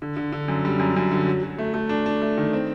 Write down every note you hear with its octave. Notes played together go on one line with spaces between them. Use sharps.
D3
D3
D3
F#2
G3
F#2
F#2
D3
F#3
F#3
A3
A3
D4
D4
A3
D#3
C4